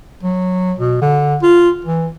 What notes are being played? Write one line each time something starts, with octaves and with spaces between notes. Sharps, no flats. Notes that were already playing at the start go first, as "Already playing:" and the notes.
F#3
B2
D3
F4
E3